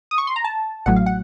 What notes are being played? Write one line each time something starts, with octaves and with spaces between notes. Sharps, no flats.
D#6
C#6
C6
A#5
A5
A1 A2 F#3 F#5
F5
F#5